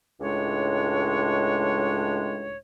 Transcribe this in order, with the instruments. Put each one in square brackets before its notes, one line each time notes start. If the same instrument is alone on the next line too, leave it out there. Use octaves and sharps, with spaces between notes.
[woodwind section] C#2 A2 G#3 D4 C#5